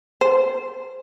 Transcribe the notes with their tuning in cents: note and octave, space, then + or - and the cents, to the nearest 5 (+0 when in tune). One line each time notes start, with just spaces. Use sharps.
C5 -5